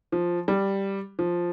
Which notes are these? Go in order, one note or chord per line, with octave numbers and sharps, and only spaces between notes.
F3
G3
F3